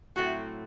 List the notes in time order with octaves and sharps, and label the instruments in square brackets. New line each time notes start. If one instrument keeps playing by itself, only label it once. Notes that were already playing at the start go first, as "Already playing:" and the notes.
[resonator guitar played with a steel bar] A2 F#3 A3 C4 [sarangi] F#4